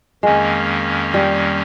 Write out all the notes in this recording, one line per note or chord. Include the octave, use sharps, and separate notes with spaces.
F2 D#3 G#3 A#3 C#4
G3